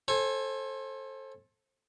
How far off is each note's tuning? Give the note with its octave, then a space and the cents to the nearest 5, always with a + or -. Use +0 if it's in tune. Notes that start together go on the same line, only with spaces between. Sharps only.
A4 +0 C5 +30 G#5 +0